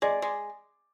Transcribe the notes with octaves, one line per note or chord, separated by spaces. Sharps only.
G#3 D5
G#3